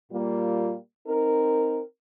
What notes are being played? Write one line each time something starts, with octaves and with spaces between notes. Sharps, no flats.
A#2 G3 A#3 F4
C4 D#4 A#4